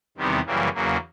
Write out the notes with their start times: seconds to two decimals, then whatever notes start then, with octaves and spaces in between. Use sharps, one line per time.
0.17 E2 C3 D#3 G3 B3
0.46 F#2 C#3 E3 G3 A#3
0.74 E2 C#3 F#3 A#3